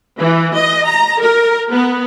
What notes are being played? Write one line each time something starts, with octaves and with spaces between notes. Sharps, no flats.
E3
D#5
A#5
A#4
B3